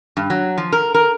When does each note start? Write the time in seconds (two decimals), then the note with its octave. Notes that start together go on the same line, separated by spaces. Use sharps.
0.17 G2
0.30 F#3
0.58 F3
0.72 A#4
0.94 A#4